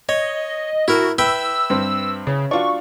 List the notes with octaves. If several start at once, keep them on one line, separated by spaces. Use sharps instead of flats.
C#5 D#5
A2 E4 F#4 A#4
B4 E5 G5 E6
G2 C4
C#3 C#4
D4 F4 F#4 C#6